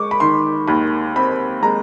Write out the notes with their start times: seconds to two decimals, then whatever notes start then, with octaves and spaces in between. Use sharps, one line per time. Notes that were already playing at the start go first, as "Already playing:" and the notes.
Already playing: G#3 C#6 D6
0.11 B5
0.20 D#3 C6
0.68 D#2 B5
1.16 C4 B5
1.63 G#3 A#5